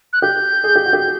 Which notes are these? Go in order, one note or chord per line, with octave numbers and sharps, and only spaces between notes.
F#6
G4 G6
G#4
G4
F#4
G4